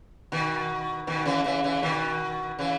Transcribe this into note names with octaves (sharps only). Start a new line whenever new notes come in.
B2 D#3
B2 D#3
C#3 E3
C#3 E3
C#3 E3
B2 D#3
C#3 E3